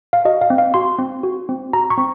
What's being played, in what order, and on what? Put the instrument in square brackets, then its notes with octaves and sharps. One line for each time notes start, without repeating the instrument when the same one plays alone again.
[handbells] F5
F#4 D#5
F5
C4
F5
F#4 C6
C4
F#4
C4
F#4 A#5
C#6
C4